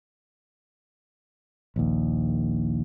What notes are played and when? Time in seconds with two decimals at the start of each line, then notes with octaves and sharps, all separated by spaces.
1.76 A#1 D#2